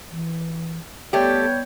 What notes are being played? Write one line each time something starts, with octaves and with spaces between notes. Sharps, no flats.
E3
G3 A3 B3 G4 C#5 G5